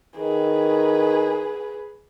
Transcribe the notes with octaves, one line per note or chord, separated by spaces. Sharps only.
D#3 G#4 B4